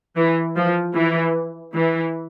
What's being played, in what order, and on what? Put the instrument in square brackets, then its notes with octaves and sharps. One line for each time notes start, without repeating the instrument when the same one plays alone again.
[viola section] E3
F3
E3
E3